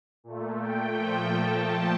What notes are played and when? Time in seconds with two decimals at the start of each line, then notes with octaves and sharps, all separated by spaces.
0.24 A#2 A3
0.60 G5
0.96 A#2 F3 A3
1.32 A5